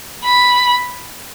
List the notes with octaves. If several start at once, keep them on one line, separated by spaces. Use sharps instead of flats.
B5